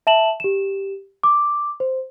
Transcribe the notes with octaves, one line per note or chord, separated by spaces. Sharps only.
E5 A5 E7 F#7
G4 E7
D6
C5